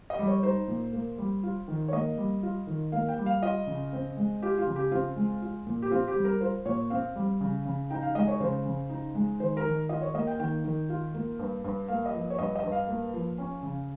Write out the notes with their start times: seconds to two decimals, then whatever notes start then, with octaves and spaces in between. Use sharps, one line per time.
0.10 D#5
0.19 G3
0.27 C#5
0.43 D#4 C5
0.68 A#2
0.93 A#3
1.18 G3
1.43 F4
1.68 D#3
1.88 C#5
1.92 A#3 D#5
2.17 G3
2.43 F4
2.67 D#3
2.92 A#3 F5
3.08 G5
3.18 G3
3.26 F5
3.42 F4 D#5
3.67 C#3
3.93 C4
4.17 G#3
4.42 F4 G4
4.58 F4
4.67 C#3
4.76 G4
4.91 C4 F4
5.16 G#3
5.42 F4
5.66 A#2
5.82 G4
5.91 C4 F4
6.08 G4
6.16 G3
6.25 A#4
6.41 F4 C5
6.66 A#2 C#5
6.90 C4 F5
7.16 G3
7.41 C#3
7.65 C#3
7.90 D#4 G5
8.03 F5
8.15 G#3 D#5
8.28 C#5
8.40 C#3 C5
8.66 C#3
8.90 D#4
9.15 G#3
9.40 D#3 C5
9.57 A#4
9.65 D#3
9.89 F4 D#5
10.02 C#5
10.14 A#3 D#5
10.27 G5
10.40 D#3 G5
10.64 D#3
10.90 F4
11.14 A#3
11.39 G2
11.64 G2
11.88 A#3 F5
12.06 D#5
12.14 F3
12.30 C#5
12.38 G2 D#5
12.55 D#5
12.63 G2
12.72 F5
12.88 A#3
13.14 F3
13.38 C#4
13.63 C#3